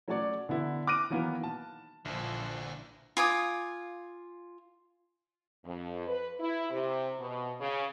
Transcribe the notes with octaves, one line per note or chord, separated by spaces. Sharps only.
F#3 A3 C#4 F#4 C#5 D5
D3 B3 E4
D6 F6 F#6 A#6 D7 D#7
D#3 E3 F#3 A#3 B3
A5
A#1 A#2 D3 E3 F3
F4 G#5 D6 D#6
F2
B4
E4
C3
B2
C#3